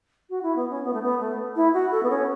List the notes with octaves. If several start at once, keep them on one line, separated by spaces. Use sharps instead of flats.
F#4
E4
B3
C#4
B3
A3
B3
A3
E4
F#4
A4
B3
C#4